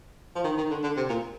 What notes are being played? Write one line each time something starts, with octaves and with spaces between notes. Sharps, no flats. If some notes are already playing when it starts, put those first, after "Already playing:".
F3
D#3
D#3
D3
D3
C3
A#2